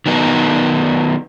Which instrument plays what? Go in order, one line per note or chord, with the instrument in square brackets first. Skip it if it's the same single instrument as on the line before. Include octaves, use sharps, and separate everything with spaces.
[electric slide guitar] D#3 F#3 B3 D#4